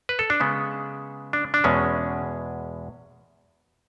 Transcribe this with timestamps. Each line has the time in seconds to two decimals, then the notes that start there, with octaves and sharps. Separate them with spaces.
0.09 B4
0.19 A4
0.30 D4
0.40 C#3 G#3 B3
1.33 D4
1.54 D4
1.64 E2 B2 G#3 C#4